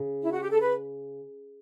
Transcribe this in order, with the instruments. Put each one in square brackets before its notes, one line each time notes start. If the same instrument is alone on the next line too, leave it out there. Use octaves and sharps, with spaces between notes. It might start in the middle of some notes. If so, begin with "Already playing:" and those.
Already playing: [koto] C#3
[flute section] E4
F#4
G4
A4
B4